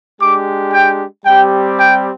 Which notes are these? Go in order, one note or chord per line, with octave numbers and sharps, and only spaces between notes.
G#3 D4 G4 D6
G5
G3 C4 G4 G5
G5